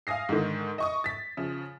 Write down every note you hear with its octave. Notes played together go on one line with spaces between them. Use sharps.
F5 G#5 D#6 A#6 C7
G#2 D3 D#3
D#5 C#6 D#6
A6 B6
C#3 F3